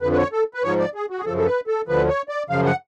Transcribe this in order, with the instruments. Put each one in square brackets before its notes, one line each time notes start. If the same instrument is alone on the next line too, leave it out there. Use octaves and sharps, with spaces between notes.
[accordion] F2 D3 F3 B4
B4
C#5
A4
B4
G#2 F3 C#5
D5
G#4
F#4
G#4
F#2 C#3 F3 A4
A4
B4
A4
D2 D3 F3 B4
C#5
D5
F#2 C#3 F3 F5
F#5